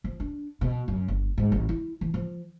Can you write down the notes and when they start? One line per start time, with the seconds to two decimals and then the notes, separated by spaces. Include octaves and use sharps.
0.04 F3
0.20 D4
0.61 B2
0.88 F#2
1.08 G1
1.38 G#2
1.52 A1
1.69 E4
2.01 E3
2.14 F3